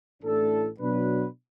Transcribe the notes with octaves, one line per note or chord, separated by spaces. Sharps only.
A1 A2 A3 D4 A4
B2 F#3 D4 B4